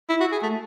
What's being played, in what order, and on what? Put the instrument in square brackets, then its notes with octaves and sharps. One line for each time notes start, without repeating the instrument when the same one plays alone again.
[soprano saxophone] E4
F#4
G#4
A3